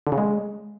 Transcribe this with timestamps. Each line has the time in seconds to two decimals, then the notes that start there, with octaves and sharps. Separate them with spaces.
0.07 D3
0.12 C#3
0.18 G#3